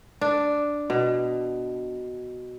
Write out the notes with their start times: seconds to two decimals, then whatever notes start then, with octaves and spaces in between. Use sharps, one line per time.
0.21 D4
0.90 B2